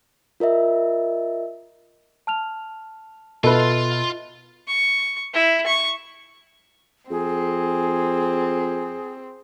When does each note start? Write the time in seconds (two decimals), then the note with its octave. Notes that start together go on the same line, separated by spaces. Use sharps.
0.40 F4 A#4 D#5 E5
2.27 A5 F6 F7
3.44 B2 F4 A4 B4 D#5 E5 C6
4.68 C#6
5.34 E4
5.66 C#6
7.10 F2 C4 G#4